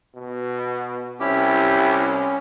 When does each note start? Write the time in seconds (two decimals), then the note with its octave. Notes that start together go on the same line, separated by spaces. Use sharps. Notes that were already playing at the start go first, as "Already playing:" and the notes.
0.15 B2
1.20 C2 C#4 E4 G4